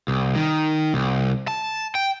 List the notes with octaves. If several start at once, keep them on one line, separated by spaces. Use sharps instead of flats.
C2
D#3
C2
A5
G5